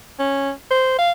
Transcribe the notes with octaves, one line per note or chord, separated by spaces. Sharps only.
C#4
C5
F5